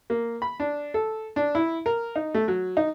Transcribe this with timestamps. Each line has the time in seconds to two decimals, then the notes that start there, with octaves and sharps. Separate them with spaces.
0.10 A#3
0.42 B5
0.60 D4
0.94 A4
1.36 D4
1.55 E4
1.86 A#4
2.16 D#4
2.34 A3
2.48 F#3
2.77 D#4